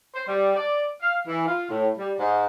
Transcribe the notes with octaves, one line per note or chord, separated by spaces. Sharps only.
C5
G3
D5
F5
E3
F4
A2
G3
G#2